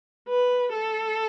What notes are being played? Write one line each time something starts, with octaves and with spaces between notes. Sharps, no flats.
B4
A4